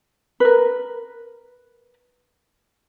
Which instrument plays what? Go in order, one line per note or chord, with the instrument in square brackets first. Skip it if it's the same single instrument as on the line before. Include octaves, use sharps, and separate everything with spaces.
[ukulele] A#4 B4